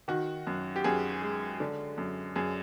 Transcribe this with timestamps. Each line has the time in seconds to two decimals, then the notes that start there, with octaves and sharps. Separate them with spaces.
0.08 D#3 F#4
0.47 F#2
0.76 G4
0.84 F#2 G#4
1.22 G#3
1.60 D3
1.98 F#2
2.36 F#2 G#4